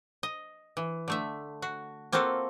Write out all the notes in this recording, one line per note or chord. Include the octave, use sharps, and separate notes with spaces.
D#5
E3
D3 A3 E5
F#4
A#3 C4 F4 F#4 A4